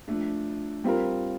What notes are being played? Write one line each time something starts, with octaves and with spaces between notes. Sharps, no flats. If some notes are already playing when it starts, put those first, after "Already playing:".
F3 A3 D4
G3 C4 F4 A#4